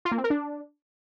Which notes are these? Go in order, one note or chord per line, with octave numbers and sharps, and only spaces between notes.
F4
A#3
C4
A#4
D4